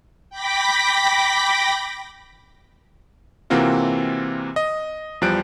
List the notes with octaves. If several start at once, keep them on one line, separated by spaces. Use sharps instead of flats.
G5 B5 D6 A#6 B6
C3 E3 A#3 C4 F4 F#4
D#5
E2 F3 G3 F#6 D7